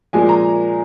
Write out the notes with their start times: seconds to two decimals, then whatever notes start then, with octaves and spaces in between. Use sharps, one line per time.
0.13 A#2 F3 G#3 G#5
0.29 A#5